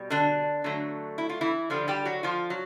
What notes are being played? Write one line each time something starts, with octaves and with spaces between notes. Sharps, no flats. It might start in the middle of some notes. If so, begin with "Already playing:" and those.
Already playing: B2 G3
D3 D4
D3 F#3 A3
E4
F4
E3 E4
D3 F3 G3 F4
G3 G4
F#3 F#4
F3 F4
F#3